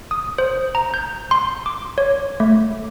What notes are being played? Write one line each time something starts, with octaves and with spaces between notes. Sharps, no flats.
D#6
C5
A#5
G6
C6
D6
C#5
A3